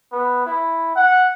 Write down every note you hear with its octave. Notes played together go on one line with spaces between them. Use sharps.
B3
E4
F#5